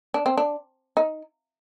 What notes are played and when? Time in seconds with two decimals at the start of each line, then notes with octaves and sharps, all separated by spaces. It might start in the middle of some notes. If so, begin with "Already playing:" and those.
0.14 D4
0.26 C4
0.38 D4
0.97 D#4